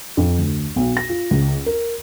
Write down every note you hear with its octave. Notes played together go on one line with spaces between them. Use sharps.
F2
D2
B1
A#6
F4
C#2
A#4